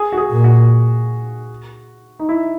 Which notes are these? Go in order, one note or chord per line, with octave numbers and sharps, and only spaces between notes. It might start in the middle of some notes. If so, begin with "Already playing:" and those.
Already playing: G#4
F#4
G#4
A#2
F#4
D#4
E4